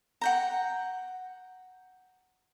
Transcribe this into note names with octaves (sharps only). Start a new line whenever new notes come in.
F#5 G5 A#5